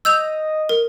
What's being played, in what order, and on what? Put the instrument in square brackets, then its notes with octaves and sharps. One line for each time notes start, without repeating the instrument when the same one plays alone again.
[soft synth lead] D#5 [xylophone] E6 G6 F7
[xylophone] A#4